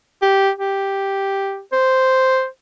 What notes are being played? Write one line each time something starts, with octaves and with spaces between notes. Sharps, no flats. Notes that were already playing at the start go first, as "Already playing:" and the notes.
G4
G4
C5